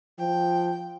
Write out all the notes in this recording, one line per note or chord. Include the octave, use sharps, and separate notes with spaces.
F3 G5